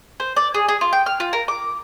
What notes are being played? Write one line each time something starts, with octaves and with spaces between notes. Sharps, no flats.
C5
D5
G#4
G#4
F4
G5
F6
F4
A#4
D6